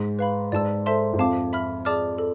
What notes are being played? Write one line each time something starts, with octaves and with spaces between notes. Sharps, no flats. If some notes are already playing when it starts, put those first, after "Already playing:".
Already playing: G#2
B4 F5 B5
G#2 D5 A5 E6
A4 C5 E5 A5 C6
G#2
F2 F5 A5 D6
E5 B5 F6
G#4 D5 A5 D6 F6
A4